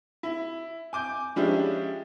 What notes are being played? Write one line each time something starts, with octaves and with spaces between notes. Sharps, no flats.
E4
G#5 D6 G6
F3 G#3 C#4 D4 E4 G4